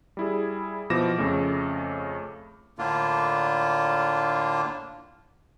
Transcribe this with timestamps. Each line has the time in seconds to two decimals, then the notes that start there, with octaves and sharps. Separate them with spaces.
0.17 G3 E4 G#4
0.90 B2 F3 E4 D6 A#6 E7
1.18 F2 C#3 A3
2.78 A2 D3 A#3 D4 F4